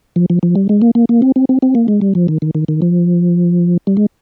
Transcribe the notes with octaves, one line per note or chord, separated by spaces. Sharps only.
F3
F3
F3
G3
G#3
A#3
A#3
A#3
C4
C4
C4
C4
A#3
G#3
G3
F3
D#3
D#3
D#3
D#3
F3
G3
G#3